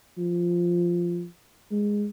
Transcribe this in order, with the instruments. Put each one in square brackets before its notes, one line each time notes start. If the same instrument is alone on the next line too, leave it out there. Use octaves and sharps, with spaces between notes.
[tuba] F3
G#3